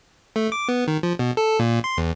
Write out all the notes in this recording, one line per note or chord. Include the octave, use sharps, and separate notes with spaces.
A3
D6
B3
D#3
F3
B2
A4
A#2
C6
E2